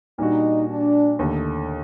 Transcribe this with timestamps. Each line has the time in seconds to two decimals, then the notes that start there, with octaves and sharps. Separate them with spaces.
0.18 A#2 G3 D4 D#4 F#4
0.69 D4
1.19 D#2 D3 A3